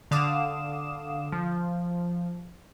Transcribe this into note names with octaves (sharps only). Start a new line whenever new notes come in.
D3 F5 D6 D#6 E7
F3